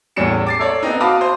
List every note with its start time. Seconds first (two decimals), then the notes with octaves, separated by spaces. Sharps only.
0.16 E2 A2 G3 C#4 C#7 E7
0.47 D6 A6 C7
0.59 A4 C#5 D5
0.83 B3 C4 D#4
1.00 F#4 F5 A5 B5 D6 D#6
1.21 C5